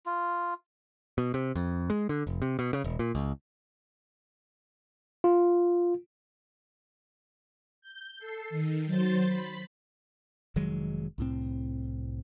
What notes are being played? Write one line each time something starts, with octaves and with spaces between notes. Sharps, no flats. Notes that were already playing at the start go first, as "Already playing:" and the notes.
F4
B2
C3
F2
G#3
D3
F1
C3
B2
C#3
E1
A#2
C#2
F4
G6
A4 C7
D#3
F#3 C5 C6 A6
B5
F1 D#3 F#3 G#3
C2 A2 C4